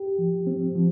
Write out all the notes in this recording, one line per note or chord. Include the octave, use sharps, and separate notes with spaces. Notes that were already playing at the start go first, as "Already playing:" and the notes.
Already playing: G4
F3
C4
F3